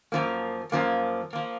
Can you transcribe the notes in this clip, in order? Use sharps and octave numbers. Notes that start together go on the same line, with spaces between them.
F#2 F3 A#3
F#2 F3 A#3
F3 A#3